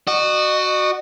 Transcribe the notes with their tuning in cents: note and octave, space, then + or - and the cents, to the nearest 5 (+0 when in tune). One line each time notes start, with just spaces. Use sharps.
F#4 +5 D#5 -40